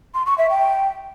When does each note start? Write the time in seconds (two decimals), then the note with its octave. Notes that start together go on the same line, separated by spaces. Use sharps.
0.14 C6
0.26 C#6
0.38 E5
0.50 G5